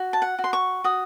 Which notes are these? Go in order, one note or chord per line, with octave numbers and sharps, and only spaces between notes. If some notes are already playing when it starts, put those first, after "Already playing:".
Already playing: F#4
A5
F#5
F#4
C6
C#6
F#4 D#6